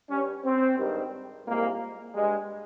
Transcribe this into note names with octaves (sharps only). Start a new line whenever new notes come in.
G2 G3 C#4
C4
G#1 G2 D#3 G3
C2 A#2 G#3 A#3
G2 G3 G#3